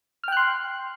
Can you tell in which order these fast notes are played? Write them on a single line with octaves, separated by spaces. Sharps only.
F6 G5 F#6 C6